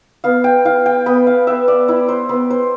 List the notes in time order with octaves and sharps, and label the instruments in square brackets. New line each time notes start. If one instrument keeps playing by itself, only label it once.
[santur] B3 F5
G5
E4 F5
G5
B3 B5
F5
B3 E5
D5
E4
C5
B3 B4
C5